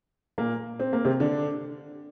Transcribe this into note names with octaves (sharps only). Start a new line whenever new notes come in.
A#2 A#3
C4
A#3
C3 C4
D3 D4